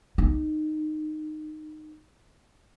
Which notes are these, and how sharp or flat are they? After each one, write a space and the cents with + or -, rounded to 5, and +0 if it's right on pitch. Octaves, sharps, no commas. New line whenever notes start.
D#4 -15